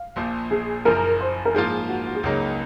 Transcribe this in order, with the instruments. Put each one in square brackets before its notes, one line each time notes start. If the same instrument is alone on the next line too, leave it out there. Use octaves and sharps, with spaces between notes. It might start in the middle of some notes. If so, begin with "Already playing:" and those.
Already playing: [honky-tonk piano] F5
[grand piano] A#1 A#2 F3
[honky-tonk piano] G#4
[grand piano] F#1 F#2 F3 [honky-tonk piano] A#4
[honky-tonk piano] C5
A#4
[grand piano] G#2 F3 A#3 F4 [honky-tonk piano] G#4
[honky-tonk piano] F#4
F#4
G#4
[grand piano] C#2 C#3 F#3 A#3 D#4